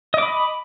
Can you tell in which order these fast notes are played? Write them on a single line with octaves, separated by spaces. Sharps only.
D#5 D6 B5